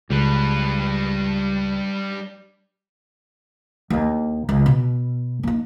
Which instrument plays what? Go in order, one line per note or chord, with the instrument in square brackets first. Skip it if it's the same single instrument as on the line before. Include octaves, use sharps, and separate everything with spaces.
[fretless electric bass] C#2 [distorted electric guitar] G3 B4
[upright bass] D#2 D4
C#2
B2
A#3 D#4